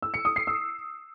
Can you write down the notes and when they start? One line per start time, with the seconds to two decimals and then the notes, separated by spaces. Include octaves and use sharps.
0.02 E6
0.14 C#7
0.25 D#6
0.36 C7
0.47 E6